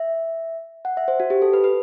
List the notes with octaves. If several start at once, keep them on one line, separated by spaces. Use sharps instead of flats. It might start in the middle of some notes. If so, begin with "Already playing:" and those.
Already playing: E5
F#5
E5
C5
F#4
G4
A4
B4
B4